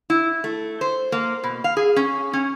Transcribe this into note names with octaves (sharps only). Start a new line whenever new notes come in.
E4
A3
C5
A#3
B2
F5
G#4
C#4
C#4